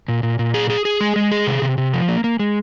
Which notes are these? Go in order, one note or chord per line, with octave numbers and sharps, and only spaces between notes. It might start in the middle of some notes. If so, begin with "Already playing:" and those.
A#2
A#2
A#2
G#4
G#4
G#4
G#3
G#3
G#4
C3
C3
C3
F3
A#3
A#3
G#3